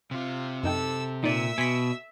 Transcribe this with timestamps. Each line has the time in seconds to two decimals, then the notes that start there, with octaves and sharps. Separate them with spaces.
0.11 C3 C4 F4
0.63 F#2 D#4 A4 G5 E6
1.24 A#2 D#4 D5 E5 E6
1.58 B2 G#5 C6 B6